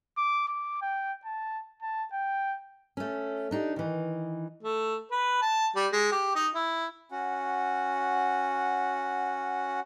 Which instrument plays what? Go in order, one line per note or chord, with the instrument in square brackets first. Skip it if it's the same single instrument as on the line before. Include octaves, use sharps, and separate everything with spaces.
[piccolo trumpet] D6
D6
G5
A5
A5
G5
[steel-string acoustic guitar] A3 C#4
D4 D#4 G4
D#3 E3
[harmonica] A3
B4
A5
G3
G#3
G4
D#4
E4
[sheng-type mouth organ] C#4 F#4 F#5